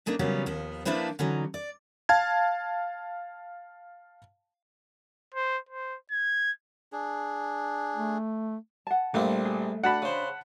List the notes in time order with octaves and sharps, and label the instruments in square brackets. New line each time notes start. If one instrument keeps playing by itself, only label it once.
[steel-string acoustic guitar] C#3 A3 A#3 D4 D#4
C#3 E3 F#3 G3 B3 C#4
D#2 F3 B3
F3 A#3 D4 E4 B4 C5
D3 E3 F#3 C#4 D#4
D5
[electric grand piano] F5 A5 G#6
[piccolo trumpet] C5
C5
G#6
[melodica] D4 G#4
[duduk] A3
[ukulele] F#5 A5
[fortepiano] A#1 [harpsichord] G3 A#3 C4 [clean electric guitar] A3
[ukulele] G#4
[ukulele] D4 F#4 [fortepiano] F#5 A5 B5
[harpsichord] C#3 C5